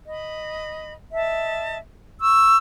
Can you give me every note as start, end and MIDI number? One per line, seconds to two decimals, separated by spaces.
0.06 0.93 75
0.06 0.93 83
1.13 1.77 75
1.13 1.77 76
1.13 1.77 81
2.20 2.56 85
2.20 2.56 88